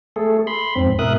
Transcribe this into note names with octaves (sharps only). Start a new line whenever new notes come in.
A3 G#4 A4
B5 C6
F2 G#2 C4
G#2 B2 A#4 E5 D#6 F#6